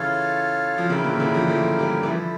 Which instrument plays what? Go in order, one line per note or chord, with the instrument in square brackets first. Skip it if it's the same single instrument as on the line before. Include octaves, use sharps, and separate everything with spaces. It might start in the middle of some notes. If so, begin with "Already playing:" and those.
Already playing: [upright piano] C#3 E3 [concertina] F4 A4 C#5 F5
[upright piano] F3
[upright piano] C#3 E3 [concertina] A#3 E4 A#4 E5 G5
[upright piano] A#2 D3
C#3 E3
D3 F3
F3 A3
E3 G3
E3
[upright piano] D3 F3 [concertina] E4 A4 E5